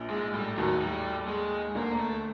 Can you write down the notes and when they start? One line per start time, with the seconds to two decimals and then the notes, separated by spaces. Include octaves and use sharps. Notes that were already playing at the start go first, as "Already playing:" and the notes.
Already playing: A#1 A#2
0.10 G#2 G#3
0.34 A2 G3
0.57 D#2 D#3 F#3
0.81 G3
1.28 G#3
1.75 D2 D3 A#3
1.99 A3